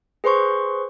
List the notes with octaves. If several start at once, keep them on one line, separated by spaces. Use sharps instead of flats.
G#4 B4 C5 C6 C#6